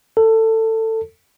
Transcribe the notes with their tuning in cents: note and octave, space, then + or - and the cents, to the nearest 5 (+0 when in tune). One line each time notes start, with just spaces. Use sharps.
A4 +20